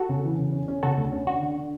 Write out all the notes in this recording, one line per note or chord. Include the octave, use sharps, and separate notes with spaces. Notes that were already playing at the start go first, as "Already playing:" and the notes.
Already playing: F#4 A4
C#3
E3
C#3
C#4
C#4
C#3 F#4 A4
D2
C#4
D3 F#4
D3
D3